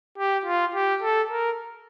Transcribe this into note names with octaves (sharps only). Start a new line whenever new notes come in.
G4
F4
G4
A4
A#4